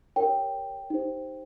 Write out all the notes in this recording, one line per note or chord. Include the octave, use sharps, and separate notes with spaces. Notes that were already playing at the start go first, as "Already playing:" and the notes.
G4 A#4 C#5 G5
D#4 G4 C5